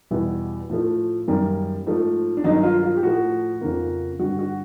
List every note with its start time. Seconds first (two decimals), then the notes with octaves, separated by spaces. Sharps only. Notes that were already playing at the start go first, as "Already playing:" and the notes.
0.11 E2 B2 G3 B3 E4
0.70 A2 F3 A3
1.28 F#2 D#3 G3 A#3
1.86 G#2 F3 A3
2.37 D4
2.44 G2 D#3 F#3 A#3 D#4
2.63 F4
2.83 F4
2.96 G4
3.03 A2 F3 A3 F#4
3.61 F2 C#3 F3 A#3
4.19 G2 D3 G3 F#4
4.39 F#4